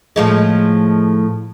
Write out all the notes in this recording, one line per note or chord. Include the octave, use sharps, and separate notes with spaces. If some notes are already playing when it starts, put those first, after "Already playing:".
A2 F3 G#3